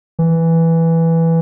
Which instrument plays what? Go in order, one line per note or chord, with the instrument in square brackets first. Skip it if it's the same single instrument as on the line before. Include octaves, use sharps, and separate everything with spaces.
[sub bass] E3